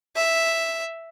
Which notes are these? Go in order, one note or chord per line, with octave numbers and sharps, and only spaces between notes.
E5